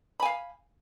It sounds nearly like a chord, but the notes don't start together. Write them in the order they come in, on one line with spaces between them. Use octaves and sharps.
B5 G#5 F5